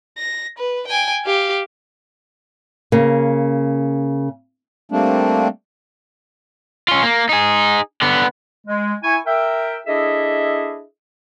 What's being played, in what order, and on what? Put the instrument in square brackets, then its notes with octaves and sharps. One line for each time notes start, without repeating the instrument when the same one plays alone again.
[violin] A#6
B4
G5 G#5
G4 F5
[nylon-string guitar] C#3 A#3
[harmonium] G3 A3 A#3 C4 D4
[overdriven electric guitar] C#4 F4
A#3
D#4 G#4
D3 B3
[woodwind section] G#3
E4 G#5 C#6
A#4 E5 G5
D4 E4 G#4 A4 D#5 E5